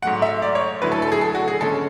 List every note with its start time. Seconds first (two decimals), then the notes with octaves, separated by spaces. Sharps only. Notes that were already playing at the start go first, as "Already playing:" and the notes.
0.02 G#2 F#3 A3 F#5
0.22 E5
0.42 D5
0.55 C#5
0.82 D3 F#3 A3 E4 B4
0.92 A4
1.02 A4
1.12 G#4
1.21 A4
1.35 F#4
1.48 G#4
1.61 D3 G#3 C#4 A4